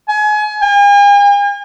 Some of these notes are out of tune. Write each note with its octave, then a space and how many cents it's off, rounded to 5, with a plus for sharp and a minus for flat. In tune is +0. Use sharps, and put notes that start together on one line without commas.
G#5 +30
G#5 -45